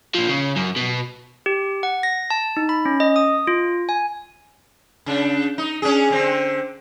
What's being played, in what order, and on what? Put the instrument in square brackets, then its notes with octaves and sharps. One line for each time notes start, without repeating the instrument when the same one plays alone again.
[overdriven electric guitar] A#2 F3
C#3
F#2
B2
[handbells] G4
F#5
A#6
A5
D#4
B5
C#4
D#5
D#6
F4
G#5
[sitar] C#3 D4
D#4
C#4 D4 G#4
D3 C4